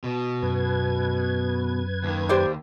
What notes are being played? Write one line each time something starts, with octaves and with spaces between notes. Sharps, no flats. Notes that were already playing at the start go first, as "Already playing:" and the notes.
B2
F#2 B4 G#6
D#2 D#3
G4 C5 D5